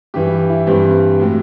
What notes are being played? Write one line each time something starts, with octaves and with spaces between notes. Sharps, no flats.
G2 E3 G3 G4
E4
G2 E3 G3 C4
A2 F#3